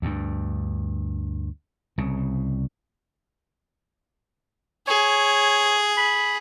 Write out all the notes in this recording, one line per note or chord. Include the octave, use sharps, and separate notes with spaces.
D2 G2
C2 C#3
G#4 C#5
B5